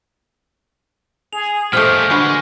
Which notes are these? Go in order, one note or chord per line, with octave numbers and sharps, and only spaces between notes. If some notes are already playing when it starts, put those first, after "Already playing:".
G#4 F7
A#2 F3 G#3 A3 G4 F6
D3 G#3 F#4 B4